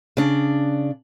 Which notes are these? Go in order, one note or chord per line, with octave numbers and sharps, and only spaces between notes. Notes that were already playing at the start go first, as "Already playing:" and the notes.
C#3 D4